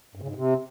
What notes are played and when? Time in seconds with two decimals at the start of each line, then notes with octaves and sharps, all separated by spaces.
0.15 G2
0.22 C#3
0.28 G#2
0.35 C3